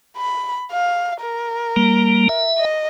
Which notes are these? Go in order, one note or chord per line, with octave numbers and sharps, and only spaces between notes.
B5
F5
A#4
G3 A#3
E5
D#5